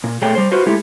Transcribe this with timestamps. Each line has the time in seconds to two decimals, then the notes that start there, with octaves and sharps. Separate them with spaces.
0.04 A#2
0.22 A#2 A3 G#4 C#5 G5
0.35 G3 C5
0.52 F#4 B4 C5
0.66 G#3 A3 E4 G4